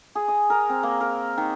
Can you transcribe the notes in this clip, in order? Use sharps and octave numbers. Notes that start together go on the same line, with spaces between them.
G#4
D#5
A#4
C4
A#3
A#4
D#3